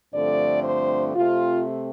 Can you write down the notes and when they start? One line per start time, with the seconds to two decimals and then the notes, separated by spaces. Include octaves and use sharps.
0.14 G2 D3 F3 A3 C4 D5
0.64 C5
1.15 C3 A3 C4 F4